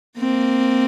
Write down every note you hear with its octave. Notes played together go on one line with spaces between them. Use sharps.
A#3 C4